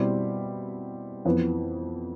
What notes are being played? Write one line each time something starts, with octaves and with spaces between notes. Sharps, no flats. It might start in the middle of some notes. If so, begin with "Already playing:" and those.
Already playing: B2 G3 C4 E4 G4
F2 E3 B3